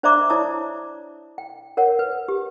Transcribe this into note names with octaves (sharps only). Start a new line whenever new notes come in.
D4 C5 D5 E5 A#5 D6
E4 C#5 D5 A5 D#6
G5
A#4 C#5 F#5
B4
G4